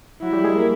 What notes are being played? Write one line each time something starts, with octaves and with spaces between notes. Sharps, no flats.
F#3 E4 F#4
G3 G4
G#3 G#4
A#3 A#4